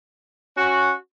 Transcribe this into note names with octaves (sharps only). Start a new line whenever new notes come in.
C#4 F#4